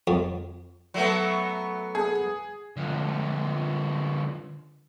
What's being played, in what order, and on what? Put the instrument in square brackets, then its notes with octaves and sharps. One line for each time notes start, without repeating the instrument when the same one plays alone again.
[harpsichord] F2
[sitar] F#3 A3 B3
[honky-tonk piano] G#4
[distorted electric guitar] D3 F3